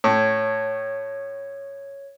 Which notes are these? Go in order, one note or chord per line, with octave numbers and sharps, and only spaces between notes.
A2 C#5 G#6